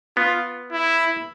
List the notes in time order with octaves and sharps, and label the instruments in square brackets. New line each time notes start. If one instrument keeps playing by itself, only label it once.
[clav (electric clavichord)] B3 [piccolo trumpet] F4
[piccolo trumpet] E4